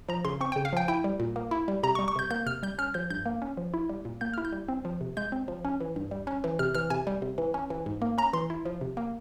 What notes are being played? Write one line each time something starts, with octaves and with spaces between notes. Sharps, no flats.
F3 A#5
C#3 C6
C4 C#6
C#3 G5
F5
F3 G5
E4 G5
G3
A#2
A#3
E4
G3
C3 A#5
G3 C#6
C#6
C3 G6
A#3 G6
C3 F6
G3 G6
C#4 F6
F3 G6
G2 G6
A#3
C#4
F3
E4
G3
A#2
A#3 G6
E4 F6
G6
G3
C4
F3
C3
G#3 G6
C4
F3
C#4
E3
G2
G3
C#4
E3
C3 F6
E3 F6
C3 G#5
G3
C3
E3
C#4
E3
G#2
A#3
C#4 A#5
E3 C6
E4
F3
C3
A#3